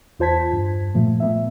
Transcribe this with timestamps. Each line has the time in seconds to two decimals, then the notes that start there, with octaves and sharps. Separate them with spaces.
0.19 E2 F4 C5 A5 G#6 B6
0.53 G2
0.95 A#2 F3 A3
1.20 A3 B3 E5